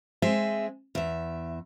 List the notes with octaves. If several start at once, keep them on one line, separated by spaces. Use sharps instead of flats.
G#3 C4 G#4 E5
E2 E5